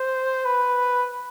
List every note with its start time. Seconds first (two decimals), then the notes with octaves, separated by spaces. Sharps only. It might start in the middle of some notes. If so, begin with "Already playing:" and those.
Already playing: C5
0.46 B4